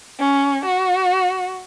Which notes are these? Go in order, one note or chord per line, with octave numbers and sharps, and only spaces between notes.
C#4
F#4